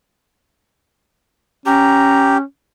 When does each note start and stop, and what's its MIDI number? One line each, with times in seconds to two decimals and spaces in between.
1.66 2.42 61
1.66 2.38 67
1.66 2.35 82